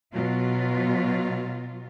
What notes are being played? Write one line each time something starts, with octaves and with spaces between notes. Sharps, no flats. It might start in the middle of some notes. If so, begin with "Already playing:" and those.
B2 F#3 F4